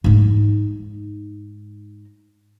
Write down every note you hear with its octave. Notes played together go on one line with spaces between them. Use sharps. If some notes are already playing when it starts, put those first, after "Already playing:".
G#2 D#4